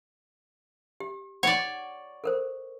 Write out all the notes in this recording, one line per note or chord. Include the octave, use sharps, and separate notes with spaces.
G4
C#5 D5 F#5
A4 A#4 C5